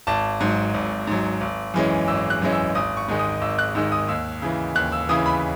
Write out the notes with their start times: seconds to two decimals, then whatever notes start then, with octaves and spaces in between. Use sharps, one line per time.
0.07 G#1 A5
0.40 G#2 F#3
0.74 G#1
1.07 G#2 F#3
1.41 G#1
1.74 F#2 E3 G#3 C#4
2.08 G#1 E6
2.30 F#6
2.42 F#2 E3 G#3 C#4
2.52 E6
2.75 G#1 D#6
2.97 C#6
3.08 G#2 D#3 G#3
3.19 D#6
3.41 G#1 E6
3.59 F#6
3.75 G#2 D#3 G#3 E6
3.92 D#6
4.08 D#2 E6
4.42 C#3 E3
4.75 D#2 F#6
4.92 E6
5.09 C#3 E3 D#6
5.26 B5